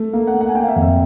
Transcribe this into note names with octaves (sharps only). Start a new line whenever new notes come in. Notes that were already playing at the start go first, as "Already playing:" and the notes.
Already playing: A3
A#3 F5
F#5
A#3
F#5
G#5
A#3 G5
F5
E5
F2
E5